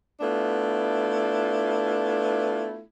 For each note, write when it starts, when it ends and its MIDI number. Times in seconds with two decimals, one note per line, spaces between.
0.21 2.83 57
0.21 2.83 59
0.21 2.83 62
0.21 2.83 64
0.21 2.83 65